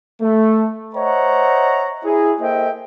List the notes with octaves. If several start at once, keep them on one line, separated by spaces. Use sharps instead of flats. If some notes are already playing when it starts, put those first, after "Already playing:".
A3
C5 C#5 D#5 E5 F#5 A#5
E4 G#4
A#3 A4 C5 D#5 E5 G5